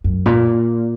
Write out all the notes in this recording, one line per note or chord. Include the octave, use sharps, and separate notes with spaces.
F#2
A#2